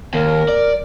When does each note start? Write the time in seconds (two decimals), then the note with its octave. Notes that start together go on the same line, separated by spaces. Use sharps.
0.14 D#2 A#4
0.48 D5